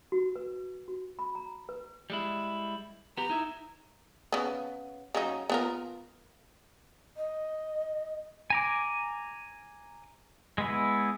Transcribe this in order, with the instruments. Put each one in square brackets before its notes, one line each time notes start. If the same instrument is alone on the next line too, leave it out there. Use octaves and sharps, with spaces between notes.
[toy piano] F#4
B4
F#4
B5
A#5
B4
[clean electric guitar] G3 G#3 E4
[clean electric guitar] B3 G4 [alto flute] A#5
[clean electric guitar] D#4 E4 E5
[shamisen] C#3 B3
C#3 F#3 D#4
B3 F4 A#4
[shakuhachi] D#5
[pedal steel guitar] G#5 A#5 D6
G#3 B3 E4